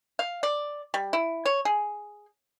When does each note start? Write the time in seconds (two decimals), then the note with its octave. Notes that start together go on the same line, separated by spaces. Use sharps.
0.19 F5
0.43 D5
0.94 G3
1.13 E4
1.45 C#5
1.65 G#4